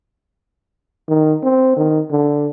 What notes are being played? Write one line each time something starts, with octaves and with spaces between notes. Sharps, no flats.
D#3
C4
D#3
D3